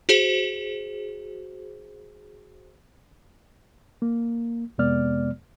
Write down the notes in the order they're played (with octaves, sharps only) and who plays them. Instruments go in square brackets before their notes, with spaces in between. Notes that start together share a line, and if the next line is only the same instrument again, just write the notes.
[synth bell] F#4 G#4 C5
[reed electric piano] A#3
F2 C3 G#3 B3 D5 F6